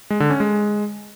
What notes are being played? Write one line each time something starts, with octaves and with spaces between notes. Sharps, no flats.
G#3
D3
C#4
G#3